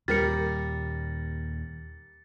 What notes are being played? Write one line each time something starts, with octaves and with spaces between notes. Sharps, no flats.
D#2 A#2 G3 A#4 A6 C#7